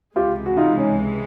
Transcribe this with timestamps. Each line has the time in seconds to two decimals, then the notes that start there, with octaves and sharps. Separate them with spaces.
0.16 C#2 C3 E3 G#3 F4 G4
0.46 F#4
0.57 D#4 F4
0.77 C#4 D#4